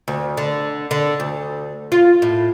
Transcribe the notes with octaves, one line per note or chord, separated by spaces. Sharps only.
D2
D3
D3
D2
F4
A2